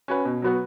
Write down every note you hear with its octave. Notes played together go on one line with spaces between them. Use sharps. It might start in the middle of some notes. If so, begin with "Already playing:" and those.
C#4 F#4 B4
B2
F#3 B3 F#4 B4